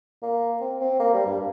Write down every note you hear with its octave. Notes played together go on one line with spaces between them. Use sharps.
A#3
C4
C4
A#3
G3
G2